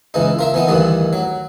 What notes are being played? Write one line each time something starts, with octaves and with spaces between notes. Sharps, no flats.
C#2 E3 D#4
F4 A#4 E5
E3 B3 D#4
D2 G2 D#3 E3
F#3